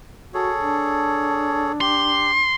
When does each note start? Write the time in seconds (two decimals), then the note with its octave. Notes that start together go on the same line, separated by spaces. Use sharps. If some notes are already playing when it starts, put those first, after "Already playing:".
0.34 F#4 G#4 A4 C#5
0.60 D4
1.81 G4 C6